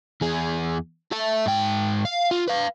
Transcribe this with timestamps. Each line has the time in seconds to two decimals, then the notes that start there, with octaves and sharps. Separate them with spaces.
0.21 E2 G#4
1.12 A4 E5
1.46 G#2 G5
2.05 F5
2.31 F4
2.48 B4 F5